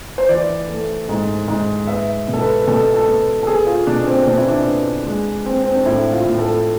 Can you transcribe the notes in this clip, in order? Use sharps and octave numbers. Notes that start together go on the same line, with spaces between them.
C5
E3 D5
A3
G#2
G#2
B3 E5
B2
A4
B4
B2 A4
A4
B3
A4
B3 G#4
F4
B2 D4
C4
B2 D4
E4
D4
B3
G#3
C4
C4
D4
A2 E4
F4
A2
A4